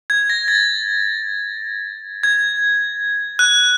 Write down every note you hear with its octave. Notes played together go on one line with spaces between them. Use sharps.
G#6
A#6
A6
G#6
F#6